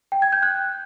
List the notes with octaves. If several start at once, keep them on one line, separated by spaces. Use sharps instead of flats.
G5
G#6
G6
F#6